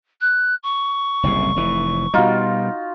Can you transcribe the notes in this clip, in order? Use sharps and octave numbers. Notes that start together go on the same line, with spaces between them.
F#6
C#6
F#1 C2 A2
F1 E3
B2 G3 D#4 F4 F#4